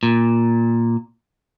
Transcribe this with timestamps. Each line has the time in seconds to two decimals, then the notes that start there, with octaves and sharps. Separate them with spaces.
0.03 A#2